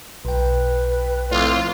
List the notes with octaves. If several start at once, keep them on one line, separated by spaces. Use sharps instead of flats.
B1 B4 G5
F2 A2 F4